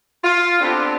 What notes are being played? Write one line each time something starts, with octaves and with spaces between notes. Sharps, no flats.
F4
B3 C4 D4 F4 G4 A4